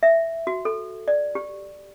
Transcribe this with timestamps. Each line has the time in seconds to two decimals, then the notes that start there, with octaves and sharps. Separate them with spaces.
0.03 E5
0.47 F#4
0.65 A4
1.08 D5
1.35 G4